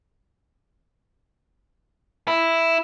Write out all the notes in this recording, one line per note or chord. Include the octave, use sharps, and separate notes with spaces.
E4